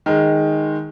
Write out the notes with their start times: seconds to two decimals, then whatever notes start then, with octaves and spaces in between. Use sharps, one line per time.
0.06 D#3 G#3